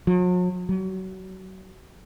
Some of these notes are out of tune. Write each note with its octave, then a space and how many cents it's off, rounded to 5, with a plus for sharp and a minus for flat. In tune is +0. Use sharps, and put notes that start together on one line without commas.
F#3 -45
F#3 +30